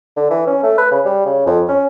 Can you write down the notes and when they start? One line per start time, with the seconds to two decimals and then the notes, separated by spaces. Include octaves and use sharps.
0.17 D3
0.30 E3
0.47 C#4
0.63 A3
0.78 B4
0.91 C#3
1.05 G3
1.26 C#3
1.46 F2
1.68 C#4